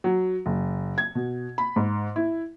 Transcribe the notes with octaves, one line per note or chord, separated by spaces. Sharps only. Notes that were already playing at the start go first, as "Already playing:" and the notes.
F#3
F#1
G#6
B2
B5
G#2
E4